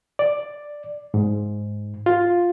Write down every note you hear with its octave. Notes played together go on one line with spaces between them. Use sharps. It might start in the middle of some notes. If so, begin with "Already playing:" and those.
D5
G#2
F4